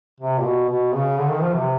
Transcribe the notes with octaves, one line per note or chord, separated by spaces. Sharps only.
C3
A#2
B2
B2
C#3
D3
D#3
F3
C3